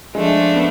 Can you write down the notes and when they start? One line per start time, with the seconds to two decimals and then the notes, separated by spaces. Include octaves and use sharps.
0.14 F3 G#3 A3 D4
0.55 B3